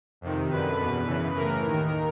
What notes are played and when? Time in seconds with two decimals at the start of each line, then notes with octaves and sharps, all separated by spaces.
0.21 F2 C3 D#3
0.50 F#2 D3 B4
0.79 E2 B2 B4
1.07 F#2 C#3 E3
1.36 A2 E3 A#4
1.64 D#2 D#3